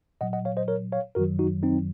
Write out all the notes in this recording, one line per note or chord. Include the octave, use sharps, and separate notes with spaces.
A#2 F#3 D#5 F#5
D#5 F#5
C#5 F5
C5 D#5
A#4 C#5
C#5 F5
F#2 D#3 F#3 F#4 A#4
D#4 F#4
C4 D#4